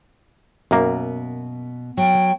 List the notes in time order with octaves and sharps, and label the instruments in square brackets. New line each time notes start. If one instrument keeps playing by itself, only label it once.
[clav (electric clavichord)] F#2 A#3 [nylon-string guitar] B2
[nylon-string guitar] F#3 [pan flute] G5